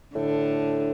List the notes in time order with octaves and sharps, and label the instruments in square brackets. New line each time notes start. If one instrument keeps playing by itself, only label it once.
[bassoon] A2 [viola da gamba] D3